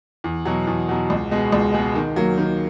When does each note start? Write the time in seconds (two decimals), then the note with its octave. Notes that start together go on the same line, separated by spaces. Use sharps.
0.24 E2
0.45 B2 F#3
0.67 E2
0.89 B2 F#3
1.10 C#2
1.31 B2 G#3
1.52 C#2
1.74 B2 G#3
1.95 D#3
2.16 F#3 A#3
2.38 D#3